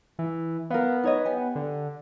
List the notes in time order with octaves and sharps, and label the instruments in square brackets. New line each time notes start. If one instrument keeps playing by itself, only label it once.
[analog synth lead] E3
[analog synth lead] B3 [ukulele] A#4 F5
[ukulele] D#4 C#5 D#5
G4 G#5
[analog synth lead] D3